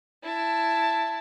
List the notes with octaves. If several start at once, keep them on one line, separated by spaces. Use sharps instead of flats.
E4 A5